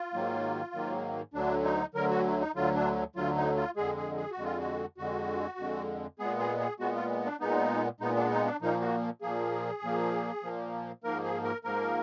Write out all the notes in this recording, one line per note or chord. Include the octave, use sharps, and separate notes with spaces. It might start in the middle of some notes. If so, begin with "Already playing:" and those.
Already playing: F4
G#2 D#3 F#3 A#3
G#2 D#3 F#3 A#3
D2 D3 F#3 D4
D#4
D2 D3 F#3 A#4
F#4
D#4
D2 D3 F#3 F4
D4
D2 D3 F#3 F4
D#4
F4
F2 D3 G#3 G#4
G#4
G#4
F#4
F2 D3 G#3
F4
F#4
F2 D3 G#3 F#4
F2 D3 G#3
A#2 G#3 B3 G#4
G#4
G#4
A#2 G#3 B3 F#4
F4
D4
A#2 G#3 B3 D#4
A#2 G#3 B3 D#4
D4
D#4
D4
A#2 F3 A#3 D#4
F#4
A#2 F3 A#3 G#4
A#2 F3 A#3
A#2 F3 A#3
G#2 F3 A#3 A#4
G#4
A#4
G#2 F3 A#3 A#4